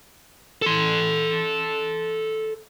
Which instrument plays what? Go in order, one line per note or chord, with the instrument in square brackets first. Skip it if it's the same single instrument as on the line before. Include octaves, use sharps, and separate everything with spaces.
[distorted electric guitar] A4 C6